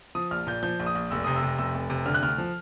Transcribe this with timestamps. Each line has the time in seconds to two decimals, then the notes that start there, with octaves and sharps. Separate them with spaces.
0.15 F3 D#6
0.31 A#1 F6
0.47 A#2 G6
0.63 F3 G6
0.80 A#1
0.86 D#6
0.95 A#1
1.11 F1 E6
1.24 C3 D#6
1.36 E6
1.43 C3
1.58 F1 E6
1.75 F1
1.90 C3
2.06 D3 F6
2.14 F#6
2.23 D2 F6
2.38 F3